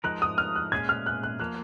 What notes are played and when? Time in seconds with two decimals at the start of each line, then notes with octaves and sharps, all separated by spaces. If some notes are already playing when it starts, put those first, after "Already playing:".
0.04 F3 G#3 D#4 A#4 F#6
0.22 D#6
0.38 F6
0.56 F#6
0.72 A#2 G#3 C#4 G#4 G#6
0.89 F6
1.06 F#6
1.23 F#6
1.40 F3 A#3 F#6